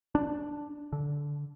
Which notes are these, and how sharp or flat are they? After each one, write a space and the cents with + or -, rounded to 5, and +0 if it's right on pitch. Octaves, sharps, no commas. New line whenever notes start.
D4 +0
D3 -15